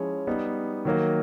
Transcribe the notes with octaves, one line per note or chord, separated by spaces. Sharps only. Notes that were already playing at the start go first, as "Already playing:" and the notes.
Already playing: F3 G#3 C#4 E4 G#4
G3 B3 D#4
D#3 F#3 A#3